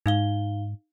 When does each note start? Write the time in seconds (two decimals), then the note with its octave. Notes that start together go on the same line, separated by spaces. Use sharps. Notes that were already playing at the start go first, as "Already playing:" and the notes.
0.06 G#2 D#4 F5 G7